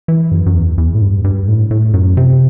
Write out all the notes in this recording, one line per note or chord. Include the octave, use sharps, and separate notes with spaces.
E3
F#2
F#2
E2
E2
A2
G2
G2
A2
A2
F#2
C3